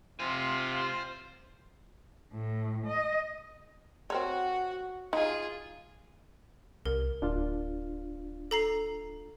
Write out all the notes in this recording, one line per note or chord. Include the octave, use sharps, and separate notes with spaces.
C3 F4 C5 G#5
A2
D#5
C4 F#4 A#4 C#5 F#5
D#4 F4 G#4
C2 A#4
D1 D4 F4 F5
A4 A#5 C7